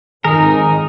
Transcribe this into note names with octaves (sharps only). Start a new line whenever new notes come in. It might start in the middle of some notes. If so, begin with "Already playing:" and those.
G#1 F2 D#3 D#4 G#4 A#4